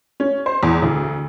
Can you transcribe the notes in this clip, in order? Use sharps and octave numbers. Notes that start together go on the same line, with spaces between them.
C#4
C5
E2
D2